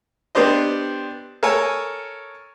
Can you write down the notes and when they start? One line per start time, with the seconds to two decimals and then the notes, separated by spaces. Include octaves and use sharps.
0.35 B3 C4 D4 G4 C5 D#5
1.43 A4 A#4 C#5 G#5